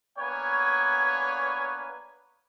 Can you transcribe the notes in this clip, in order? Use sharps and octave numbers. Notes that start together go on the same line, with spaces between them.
A#3 B3 D4 B4 C#5 G#5